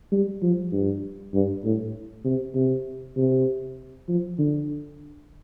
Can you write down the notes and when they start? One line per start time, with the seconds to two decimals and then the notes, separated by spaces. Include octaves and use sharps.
0.12 G3
0.42 F3
0.72 G2
1.34 G2
1.64 A2
2.25 C3
2.55 C3
3.17 C3
4.08 F3
4.38 D3